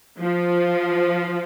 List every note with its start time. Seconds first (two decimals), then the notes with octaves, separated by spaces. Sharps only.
0.18 F3